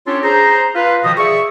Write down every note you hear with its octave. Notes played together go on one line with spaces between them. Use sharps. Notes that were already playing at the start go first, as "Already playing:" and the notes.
C#4 D4 F4 G4 A4 C#5
G#4 C5 A#5
F4 B4 F5
B2 D#3 F3 G3 D#5 D#6
G#4 D5 E5 C#6